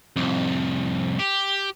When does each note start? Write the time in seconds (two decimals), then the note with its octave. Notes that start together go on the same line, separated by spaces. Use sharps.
0.16 C2 F2
1.19 G4